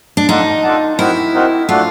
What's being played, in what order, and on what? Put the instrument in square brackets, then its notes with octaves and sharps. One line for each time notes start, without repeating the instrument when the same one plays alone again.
[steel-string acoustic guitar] D4
[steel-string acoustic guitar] D#4 [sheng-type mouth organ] F4 A4 D5 F#5 A5
[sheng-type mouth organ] F4 A4 D5 F#5 A5
[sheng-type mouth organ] C4 D#4 F#4 A#4 [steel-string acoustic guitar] E4
[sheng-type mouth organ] C4 D#4 F#4 A#4
[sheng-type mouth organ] A3 D4 F#4 A4 [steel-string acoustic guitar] F4